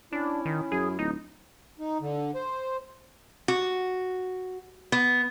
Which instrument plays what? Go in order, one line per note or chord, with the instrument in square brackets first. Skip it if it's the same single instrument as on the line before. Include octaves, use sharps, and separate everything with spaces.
[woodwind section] C#4 E4 [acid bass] D4
[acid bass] D#3
[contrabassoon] F#2 [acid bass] G#4
[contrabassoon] D1 [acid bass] D#4
[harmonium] D#4
D3
C5
[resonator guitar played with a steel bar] F#4
B3